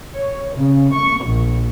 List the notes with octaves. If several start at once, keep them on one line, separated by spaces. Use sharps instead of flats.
C#5
C#3
C#6
A#1